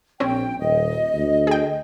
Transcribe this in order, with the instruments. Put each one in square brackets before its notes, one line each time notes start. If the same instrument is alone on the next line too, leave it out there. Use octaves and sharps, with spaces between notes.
[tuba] A#1 [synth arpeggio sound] C4 C#4 [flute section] G5
[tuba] D#1 [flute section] D#5
[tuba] D2
[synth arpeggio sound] G#4 G5